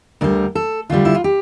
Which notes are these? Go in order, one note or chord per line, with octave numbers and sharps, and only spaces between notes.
D2 D3 G3 A#4
A4
D2 D3 G3 F4
E4
F4
G4